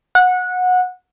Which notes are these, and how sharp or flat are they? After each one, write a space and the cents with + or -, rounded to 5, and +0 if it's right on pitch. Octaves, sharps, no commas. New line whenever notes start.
F#5 -20